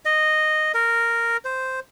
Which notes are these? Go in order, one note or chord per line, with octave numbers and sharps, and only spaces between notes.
D#5
A#4
C5